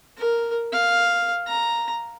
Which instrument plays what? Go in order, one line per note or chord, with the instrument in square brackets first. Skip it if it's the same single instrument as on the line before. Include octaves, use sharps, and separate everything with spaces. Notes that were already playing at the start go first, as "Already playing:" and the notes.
[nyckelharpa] A#4
F5
A#5